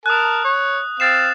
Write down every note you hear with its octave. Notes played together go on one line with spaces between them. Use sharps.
A#4 A5 D#6 F#6
C#5
C4 F5 A6 C7 E7